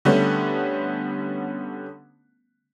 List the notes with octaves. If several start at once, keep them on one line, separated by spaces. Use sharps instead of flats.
D3 G3 A3 B3 C#4